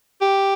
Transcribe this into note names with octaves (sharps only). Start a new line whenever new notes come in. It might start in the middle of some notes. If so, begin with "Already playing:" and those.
G4